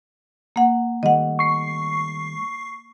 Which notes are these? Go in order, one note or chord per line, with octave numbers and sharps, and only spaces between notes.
A#3 F#5
D#3 G3 A3 D#5 F#5
C#6 C7